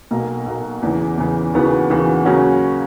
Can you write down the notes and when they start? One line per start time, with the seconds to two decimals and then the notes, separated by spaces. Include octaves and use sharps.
0.11 B1 B2 A#3
0.46 B1 B2 A#3
0.82 E2 C#3 E3
1.17 E2 C#3 E3
1.54 D#2 C#3 E3 B3 F#4
1.90 D#2 C#3 E3 B3 F#4
2.25 C#3 F#3 A#3 C#4 F#4